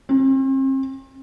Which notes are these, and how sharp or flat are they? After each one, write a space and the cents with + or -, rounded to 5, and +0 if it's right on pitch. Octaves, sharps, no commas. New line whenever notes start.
C4 +40